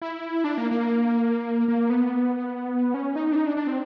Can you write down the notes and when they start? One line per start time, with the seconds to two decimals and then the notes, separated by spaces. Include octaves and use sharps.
0.02 E4
0.44 D4
0.58 A#3
0.71 A#3
1.68 A#3
1.90 B3
2.94 C#4
3.16 D#4
3.32 D4
3.36 D#4
3.46 D4
3.57 D4
3.67 C4